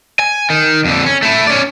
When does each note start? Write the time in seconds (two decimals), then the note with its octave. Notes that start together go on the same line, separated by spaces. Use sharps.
0.19 G#5
0.50 D#3
0.85 F2 D3
1.06 C#4
1.22 A3 E4
1.47 C#4 D5